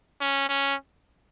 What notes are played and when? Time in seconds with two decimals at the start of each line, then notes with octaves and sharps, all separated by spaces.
0.21 C#4
0.49 C#4